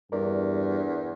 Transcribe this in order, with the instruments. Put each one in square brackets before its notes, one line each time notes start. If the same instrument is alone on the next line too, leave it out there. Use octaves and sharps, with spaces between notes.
[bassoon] E2 [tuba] G2 [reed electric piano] A#4 D5